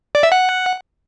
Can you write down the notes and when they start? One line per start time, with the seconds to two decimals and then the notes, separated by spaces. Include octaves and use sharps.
0.15 D5
0.23 E5
0.32 F#5